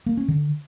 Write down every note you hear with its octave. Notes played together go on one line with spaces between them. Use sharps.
A#3
C#4
D3